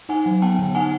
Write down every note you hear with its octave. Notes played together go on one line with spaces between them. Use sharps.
D#4 F#5 G#5
F#3
B3 G5 A5
D3
D#4 F#5 G#5